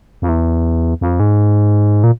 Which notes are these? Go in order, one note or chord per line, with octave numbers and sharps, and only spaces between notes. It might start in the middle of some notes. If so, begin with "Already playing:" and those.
F2
E2
F2
G#2
A#2